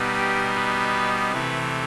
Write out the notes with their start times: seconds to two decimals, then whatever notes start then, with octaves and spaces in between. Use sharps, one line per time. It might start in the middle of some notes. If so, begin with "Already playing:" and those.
Already playing: B2 G3 B3 D#4
0.18 G4
0.56 B4
1.31 C3 E3 A3 B4